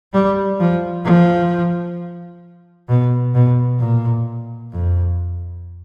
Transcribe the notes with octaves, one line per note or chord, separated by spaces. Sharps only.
G3
F3
F3
B2
B2
A#2
F2